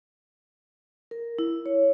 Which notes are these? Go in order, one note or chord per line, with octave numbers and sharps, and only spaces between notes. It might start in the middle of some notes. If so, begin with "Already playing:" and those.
A#4
E4
C#5